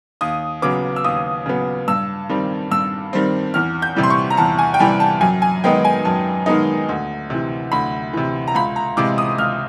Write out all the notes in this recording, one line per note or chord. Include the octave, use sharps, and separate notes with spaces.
D#2 D#6
C#3 F#3 B3 D6
E6
D#2 D#6
C#3 F#3 B3
G2 E6
D#3 G3 C4
G2 E6
D#3 G3 C4
E2 F6
G6
C3 E3 G3
C6
C#6
A#5
E2 A5
G#5
G5
C3 E3 G3 G#5
A5
F#2 G#5
G#5
D#3 G#3 B3 D#4 G5
G#5
F#2 A5
D#3 G#3 B3 D#4
D2
C3 E3
D2 B5
C3 E3
A#5
C#2 B5
A#5
C3 E3 G#3 D6
D#6
C#2 F6